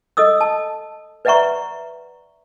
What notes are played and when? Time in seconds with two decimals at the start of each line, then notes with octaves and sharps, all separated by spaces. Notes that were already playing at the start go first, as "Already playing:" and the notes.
0.17 A4 D#5 D#6 E6
0.41 A5
1.25 B4 D5 E5 F#5 A#5 C#6